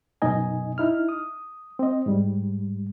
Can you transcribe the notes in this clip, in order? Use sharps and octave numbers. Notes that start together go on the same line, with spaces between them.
F#2 B2 D#4 D#5 G#5
D#4 E4 F6
D#6
C4 D#5
G#2 G3